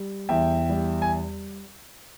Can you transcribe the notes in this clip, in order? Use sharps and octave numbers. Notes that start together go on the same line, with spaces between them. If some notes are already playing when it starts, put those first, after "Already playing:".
Already playing: G3
E2 E5 G5
G3
G#5